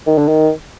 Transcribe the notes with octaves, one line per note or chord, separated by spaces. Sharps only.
D#3
D3
D#3